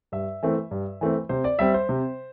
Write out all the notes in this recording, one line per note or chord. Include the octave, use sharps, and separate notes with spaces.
G2 E5
E3 A3 C4
G2
E3 A3 C4
C3 C5
D5
G3 C4 E5
C5
C3